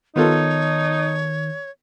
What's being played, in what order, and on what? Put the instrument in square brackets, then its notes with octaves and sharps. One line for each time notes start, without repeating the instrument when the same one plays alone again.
[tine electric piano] D#3 [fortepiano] B3 F4 A4 [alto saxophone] D#4 [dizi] C#5